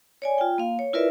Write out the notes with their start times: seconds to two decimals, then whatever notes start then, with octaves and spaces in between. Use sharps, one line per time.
0.22 C#5 D5 G#5
0.38 F4 G5
0.58 A#3 F5
0.79 C#5
0.93 E4 F4 A#4 B4 D5 E5